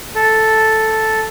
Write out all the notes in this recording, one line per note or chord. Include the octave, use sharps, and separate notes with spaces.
A4